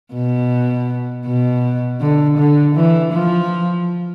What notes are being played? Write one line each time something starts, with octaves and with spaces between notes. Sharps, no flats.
B2
B2
D3
D3
E3
F3